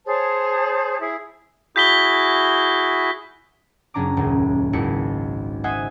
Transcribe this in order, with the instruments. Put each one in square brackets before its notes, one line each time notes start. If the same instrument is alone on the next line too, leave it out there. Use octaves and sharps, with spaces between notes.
[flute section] G#4 C5 C#5 A5
E4 G#4
[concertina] E4 F#4 G#4 [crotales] G6 B6 G7
[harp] F#1 C#4 D4 A#5 D6
D#1 C#2
G#1 C#2 E4 C#7
C5 D#5 E5 F#5 G#5